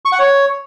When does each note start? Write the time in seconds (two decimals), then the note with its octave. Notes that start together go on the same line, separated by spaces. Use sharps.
0.05 C#6
0.12 F#5
0.19 C#5